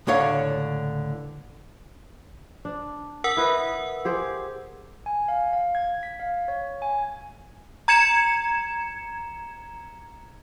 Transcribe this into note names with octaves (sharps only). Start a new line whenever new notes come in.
C#2 A2 D3 C#5 F5
D4
A#4 F#5 E6
E4 B4 D#5
G4 G#4 C5
G#5
F5
F5
G#6
B6
F5
C#5
G#5
A#5 G#6 C#7 E7